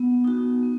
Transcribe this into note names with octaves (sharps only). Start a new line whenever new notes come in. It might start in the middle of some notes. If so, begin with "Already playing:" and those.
Already playing: B3
D#4 F#4
B3